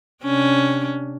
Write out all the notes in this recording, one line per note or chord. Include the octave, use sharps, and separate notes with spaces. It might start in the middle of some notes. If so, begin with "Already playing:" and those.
C3 C#4 D4